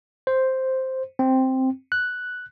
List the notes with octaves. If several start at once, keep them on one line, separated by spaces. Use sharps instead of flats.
C5
C4
F#6